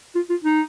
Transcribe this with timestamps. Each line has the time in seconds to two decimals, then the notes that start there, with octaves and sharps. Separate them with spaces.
0.15 F4
0.30 F4
0.44 D#4